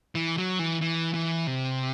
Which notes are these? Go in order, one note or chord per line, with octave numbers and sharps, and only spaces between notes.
E3
F#3
E3
E3
E3
C3